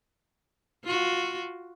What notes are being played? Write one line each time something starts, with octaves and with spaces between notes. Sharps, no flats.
F4 F#4